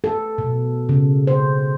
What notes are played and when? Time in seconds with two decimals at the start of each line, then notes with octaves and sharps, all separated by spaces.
0.04 A4
0.38 B2
0.89 C#3
1.27 C5